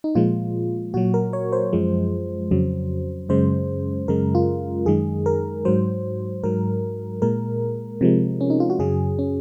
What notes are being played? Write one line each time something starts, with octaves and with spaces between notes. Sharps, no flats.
D#4
A#2 F3 G#3 F4
A#2 F#3 F#4
A#4
C#5
C5
F#2 F3 G#3
F2 C#3 F#3
F#2 C#3 G#3 C5
F#2 C#3 G#3 A#4
F4
F#2 D#3 G#3 G#4
A#4
G#2 F#3 C5
G#2 F#3 A#4
A#2 G#3 A#4
C3 F3 G#3
C#4
D#4
F4
F#4
F#2 C#3 F#3 G#4
C#4